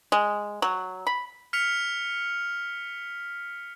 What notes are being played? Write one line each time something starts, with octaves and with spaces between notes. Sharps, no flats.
G#3
F#3
B5
F6 B6 C#7 F7